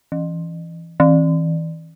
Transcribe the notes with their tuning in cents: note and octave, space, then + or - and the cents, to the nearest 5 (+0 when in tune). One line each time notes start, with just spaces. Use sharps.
E3 +15
E3 -30